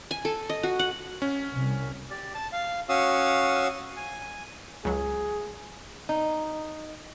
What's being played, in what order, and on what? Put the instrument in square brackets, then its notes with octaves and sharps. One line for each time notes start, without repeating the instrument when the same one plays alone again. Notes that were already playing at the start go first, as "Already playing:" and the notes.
[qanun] G#5
A4
D#5
F#4
F#5
[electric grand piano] C#4
[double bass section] C2
[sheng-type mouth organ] G4 D5
A5
F5
C#4 F#4 F5 D#6 E6
G#5
[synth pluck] C#2 F#3 [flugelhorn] G#4
[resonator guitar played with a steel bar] D#4